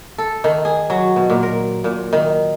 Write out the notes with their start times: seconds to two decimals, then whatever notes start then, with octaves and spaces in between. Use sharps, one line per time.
0.18 A4
0.44 D#3
0.65 G#4
0.90 F#3
1.16 B2
1.30 A#2
1.43 A#4
1.84 A#2
2.13 D#3